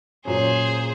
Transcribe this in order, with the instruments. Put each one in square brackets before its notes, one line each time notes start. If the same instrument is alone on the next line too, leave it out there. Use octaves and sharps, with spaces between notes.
[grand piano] A#2 F#3 C#4 [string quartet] G#4 C5